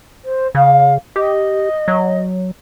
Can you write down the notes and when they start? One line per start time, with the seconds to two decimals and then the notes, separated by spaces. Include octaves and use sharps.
0.24 C5
0.55 C#3 F5
1.16 G4 D#5
1.88 F#3